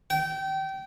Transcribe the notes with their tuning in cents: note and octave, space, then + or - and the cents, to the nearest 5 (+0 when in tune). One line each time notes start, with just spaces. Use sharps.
G5 -25